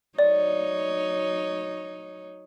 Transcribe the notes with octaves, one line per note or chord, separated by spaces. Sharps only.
F#3 D#4 C#5 D5